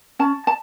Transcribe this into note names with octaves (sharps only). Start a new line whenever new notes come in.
C#4 A5
A5